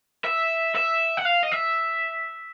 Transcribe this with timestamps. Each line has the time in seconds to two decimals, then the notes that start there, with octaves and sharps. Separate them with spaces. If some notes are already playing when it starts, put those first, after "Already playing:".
0.24 E5
0.75 E5
1.17 F#5
1.25 F5
1.43 D#5
1.52 E5